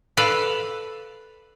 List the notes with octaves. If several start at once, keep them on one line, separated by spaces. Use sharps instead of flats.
A4 B4 D5 F5